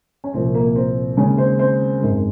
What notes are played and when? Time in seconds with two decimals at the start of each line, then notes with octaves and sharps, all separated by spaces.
0.24 C#4
0.34 C2 A#2 F3 C4
0.55 A#3
0.75 C4
1.17 D#2 C#3 G#3 C#4
1.38 C4 C5
1.59 C4 C5
2.00 G#1 F#2 D#3 G#3